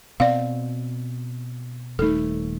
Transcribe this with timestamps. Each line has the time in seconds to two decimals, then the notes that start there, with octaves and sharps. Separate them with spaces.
0.20 B2 C4 D5 F5
1.99 D#1 A3 D#4 A4